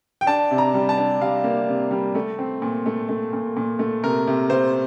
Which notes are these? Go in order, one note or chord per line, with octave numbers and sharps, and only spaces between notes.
G5
D4 A5
C3
A#5
G3
A5
D4
G3 F5
A#3
C3
G3
A3
C4
A#2
A3
A3
A#2
A#2
A3
C3 A#4
C3
C3 C5